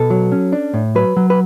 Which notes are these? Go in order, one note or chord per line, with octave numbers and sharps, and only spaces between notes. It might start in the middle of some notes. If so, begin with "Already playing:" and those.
Already playing: B2 A4
F#3
C#4
D4
A2
F#3 B4
F#3
B4